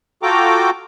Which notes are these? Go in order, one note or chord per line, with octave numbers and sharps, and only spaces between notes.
F4 F#4 A4 G5 A#5 D6